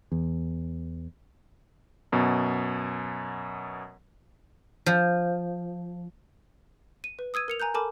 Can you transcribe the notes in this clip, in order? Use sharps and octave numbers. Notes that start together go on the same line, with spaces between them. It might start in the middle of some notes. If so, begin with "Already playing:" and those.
E2
F#2 B2
F3
D#7
B4
D#6 E6 G#6 D#7
A#4 C#7 F7
G#5 A#5 F#6 G6
A4 A#4 G#5 A5 B5 D6